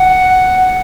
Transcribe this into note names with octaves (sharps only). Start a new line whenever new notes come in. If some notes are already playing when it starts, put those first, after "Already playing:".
Already playing: F#5